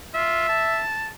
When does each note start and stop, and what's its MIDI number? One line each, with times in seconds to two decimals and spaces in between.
0.15 0.46 65
0.15 0.81 76
0.49 1.09 81